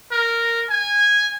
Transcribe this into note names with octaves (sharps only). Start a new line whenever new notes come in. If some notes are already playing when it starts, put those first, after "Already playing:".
A#4
G#5